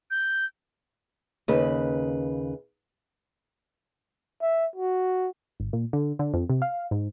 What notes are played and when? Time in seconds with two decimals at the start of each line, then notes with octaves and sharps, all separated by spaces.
0.11 G6
1.48 D#2 C#3 B4
4.41 E5
4.76 F#4
5.60 G#1
5.73 A#2
5.93 D3
6.19 D3
6.34 F2
6.50 C3
6.62 F5
6.91 G#2